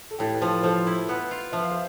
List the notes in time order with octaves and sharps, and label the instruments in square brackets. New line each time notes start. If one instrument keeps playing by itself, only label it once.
[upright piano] A4
[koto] A2 [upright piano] E4 G4
[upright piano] B4
[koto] F3 [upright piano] F4 A4
[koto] F3 [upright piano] A4 C5
[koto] E4
B3
F4
[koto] F3 [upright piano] E5
[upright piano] F5
C5 E5